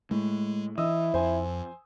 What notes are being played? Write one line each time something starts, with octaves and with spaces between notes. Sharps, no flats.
A2 G#3
E3 E4 D#5 D#6 E6
F2 C5 G#5